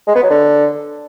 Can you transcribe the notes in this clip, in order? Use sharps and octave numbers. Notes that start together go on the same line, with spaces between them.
G#3
B3
F#3
D3